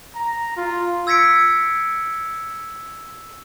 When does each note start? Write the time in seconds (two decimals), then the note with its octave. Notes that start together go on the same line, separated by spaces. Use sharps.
0.15 A#5
0.57 F4
1.07 E6 G#6 A#6 B6 C#7 D7